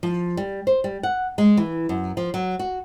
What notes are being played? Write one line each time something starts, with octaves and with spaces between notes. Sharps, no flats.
F3
G3
C5
G3
F#5
G#3
E3
F#2
F3
F#3
F#4